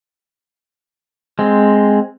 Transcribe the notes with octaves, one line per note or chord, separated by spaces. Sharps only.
G#3 C4